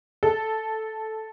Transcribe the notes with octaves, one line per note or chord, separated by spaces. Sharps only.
A4